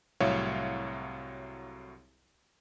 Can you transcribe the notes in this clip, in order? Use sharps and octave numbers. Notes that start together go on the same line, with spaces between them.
C2 A2 F#3 C#5 E5 F5